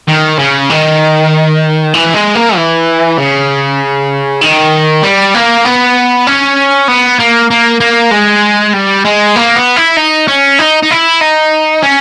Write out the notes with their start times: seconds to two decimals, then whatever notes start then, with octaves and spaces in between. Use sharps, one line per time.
0.08 D#3
0.39 C#3
0.70 D#3
1.94 E3
2.14 G#3
2.35 A#3
2.56 E3
3.18 C#3
4.41 D#3
5.03 G3
5.34 A#3
5.65 B3
6.27 C#4
6.88 B3
7.20 A#3
7.51 A#3
7.80 A#3
8.11 G#3
8.74 G3
9.05 G#3
9.36 A#3
9.56 B3
9.77 E4
9.97 D#4
10.28 C#4
10.59 D#4
10.83 D#4
10.90 E4
11.21 D#4
11.82 C#4